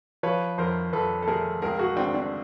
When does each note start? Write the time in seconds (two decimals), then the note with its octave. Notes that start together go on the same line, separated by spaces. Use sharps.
0.23 F3 B4 C#5
0.58 F2 A#4 C5
0.93 F2 A4 B4
1.22 A4
1.27 A3 G#4 A#4
1.62 C#2 G#4 A#4
1.79 F#4 G#4
1.96 C#2 C4 D4
2.14 C4 D4